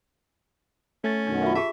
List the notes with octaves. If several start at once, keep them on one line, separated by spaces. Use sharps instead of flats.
A3 C#4 A6
F#2 B2 D#3 D4
F4 E5
G4 G#4 E5 A5